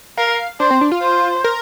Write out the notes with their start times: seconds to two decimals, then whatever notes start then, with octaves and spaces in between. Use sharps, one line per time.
0.18 A#4 F5
0.60 D4 C5
0.71 C4
0.81 D4
0.92 F4
1.02 C5
1.44 A#4